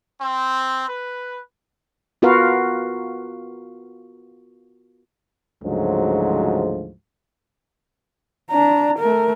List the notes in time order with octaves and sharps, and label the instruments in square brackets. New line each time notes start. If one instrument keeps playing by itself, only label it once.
[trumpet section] C4
B4
[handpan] B3 F4 F#4 A#4 B4 F5
[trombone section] D2 G#2 C#3 F3 F#3 G#3
[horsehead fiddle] D4 A#5
A3 A#4